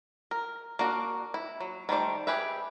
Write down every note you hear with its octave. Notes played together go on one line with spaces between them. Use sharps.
A#4
A#3 D4 F#4 A#4
E4
F#3
D#3 G3 A3 C5 D5
G4 G#4 B4 E5